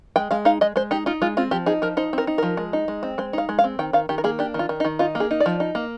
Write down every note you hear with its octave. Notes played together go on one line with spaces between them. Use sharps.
G#3 G5
G#3 F5
D#4 F5
G#3 D#5
G#3 C5
D#4 G4
D#4 F4
G#3 F4
C4 F4
F3 G4
D#4 G#4
F3 A#4
D#4 C5
C4 A#4
D#4
F3 A#4
G#3
D#4
G#3
C4
G#3 C5
D#4 F5
G#3
F5
C4
D#3 G5
D#3 F5
D#3 G4
A#4
A#3 G#4
D4 G4
D#3 F4
D#3
D#4
D#3
D#4 F4
A#3
G#4
D#4
D5
F3
D#4
A#3